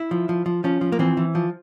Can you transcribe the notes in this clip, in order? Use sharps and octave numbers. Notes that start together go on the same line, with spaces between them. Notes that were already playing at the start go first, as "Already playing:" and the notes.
Already playing: E4
F3
F3
F3
F3 C#4
F3
A#3
E3 C4
E3
F3